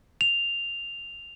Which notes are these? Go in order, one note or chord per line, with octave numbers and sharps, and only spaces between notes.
F7